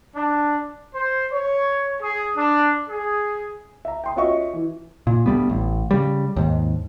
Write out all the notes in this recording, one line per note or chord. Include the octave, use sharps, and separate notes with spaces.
D4
C5
C#5
G#4
D4
G#4
E5 A#5
G5 C6 D#6
C#4 F4 F#4 D#5 E5 C#6
E3
A#2
D2 G3 B3
A1
C#3 G3
D#2 G#2